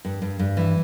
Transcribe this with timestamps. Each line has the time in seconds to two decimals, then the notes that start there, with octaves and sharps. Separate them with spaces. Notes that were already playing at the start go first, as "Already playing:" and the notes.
0.05 G2
0.22 G2
0.39 G2
0.57 E3